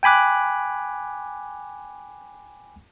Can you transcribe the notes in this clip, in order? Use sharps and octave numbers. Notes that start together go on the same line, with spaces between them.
G5 G#5 B5 D6 F#6